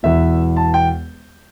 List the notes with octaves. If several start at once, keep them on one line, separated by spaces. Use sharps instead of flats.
E1 E2 E3 E5
A5
G5